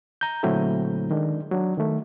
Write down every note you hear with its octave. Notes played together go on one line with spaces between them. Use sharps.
A#5 G6
A#2 D3 F#3 A3 C4 E4
D#3 G#3 D4
F#3 D4
D#3 A3